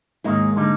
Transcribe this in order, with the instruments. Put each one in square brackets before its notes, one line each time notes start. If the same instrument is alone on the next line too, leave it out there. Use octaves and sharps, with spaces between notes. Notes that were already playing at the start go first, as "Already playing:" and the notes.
[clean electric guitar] D#2 D#3 A#3 D#4 [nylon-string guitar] G#2 G#3
[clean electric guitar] D3 G3 A#3 D#4